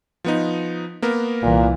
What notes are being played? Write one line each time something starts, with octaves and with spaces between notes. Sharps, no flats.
F3 B3 D#4
A#3 B3 A#4
C2 A#2 E3